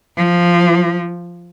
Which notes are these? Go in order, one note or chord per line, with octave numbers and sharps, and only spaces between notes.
F3